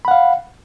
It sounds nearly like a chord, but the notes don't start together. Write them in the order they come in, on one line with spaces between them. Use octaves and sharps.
B5 F#5 F5